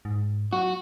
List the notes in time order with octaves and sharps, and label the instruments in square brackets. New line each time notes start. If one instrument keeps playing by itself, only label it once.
[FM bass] G#2
[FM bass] F#3 [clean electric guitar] F#4